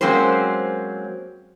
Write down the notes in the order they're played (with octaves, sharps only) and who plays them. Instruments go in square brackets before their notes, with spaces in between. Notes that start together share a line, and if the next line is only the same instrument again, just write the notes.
[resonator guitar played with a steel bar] F#3 G#3 A#3 C4 C#4 C5